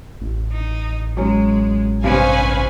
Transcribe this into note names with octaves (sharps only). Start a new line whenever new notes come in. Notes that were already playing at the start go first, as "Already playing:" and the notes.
A1
D#4
F#3 G#3 C#4
G2 C3 C#4 B4 C5 F5 G#5